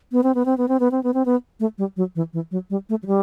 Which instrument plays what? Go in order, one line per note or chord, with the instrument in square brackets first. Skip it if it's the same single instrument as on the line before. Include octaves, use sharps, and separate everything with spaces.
[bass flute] B3
C4
B3
C4
B3
C4
B3
C4
B3
C4
B3
A3
G3
F#3
E3
E3
F#3
G3
A3
F#3
G3